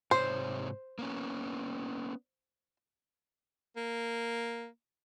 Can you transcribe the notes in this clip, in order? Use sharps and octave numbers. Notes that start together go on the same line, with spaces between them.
G#2 C3 C5 C#5
A#3 B3 C#4
A#3